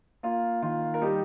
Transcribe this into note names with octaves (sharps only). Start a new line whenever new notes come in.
A#3 F4
D#3 F4
A#4
G3 D#4 G4